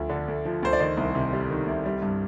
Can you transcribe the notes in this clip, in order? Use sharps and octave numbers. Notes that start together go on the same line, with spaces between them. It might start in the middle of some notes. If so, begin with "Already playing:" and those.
Already playing: D2 F3
D3
D2
F3
D2 C5
D5
D#3 C5 D#5
C2
C3
G3
D#3
C2
G3
G2